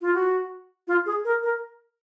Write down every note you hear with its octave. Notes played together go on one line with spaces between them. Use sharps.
F4
F#4
F4
G#4
A#4
A#4